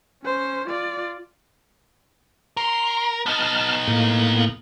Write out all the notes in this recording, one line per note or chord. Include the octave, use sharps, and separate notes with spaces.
C#4 C5
F4 D5
A#4 C6
B3 D#4 A5 F6
A2 A#3